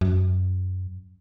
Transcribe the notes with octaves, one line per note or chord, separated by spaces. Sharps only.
F#2